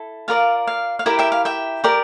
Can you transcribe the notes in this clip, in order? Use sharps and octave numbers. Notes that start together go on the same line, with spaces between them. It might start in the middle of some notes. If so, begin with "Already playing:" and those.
Already playing: E4 A4
F4 A#4 D5 F5
F5
F5
E4 G4 A#4 E5 G5
E5 G5
F5
E5 G5
G4 A#4 D5